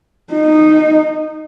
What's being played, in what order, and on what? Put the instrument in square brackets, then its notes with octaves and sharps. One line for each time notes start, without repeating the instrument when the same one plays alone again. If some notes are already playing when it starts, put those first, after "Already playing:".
[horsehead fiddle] D#4